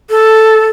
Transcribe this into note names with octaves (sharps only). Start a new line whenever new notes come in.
A4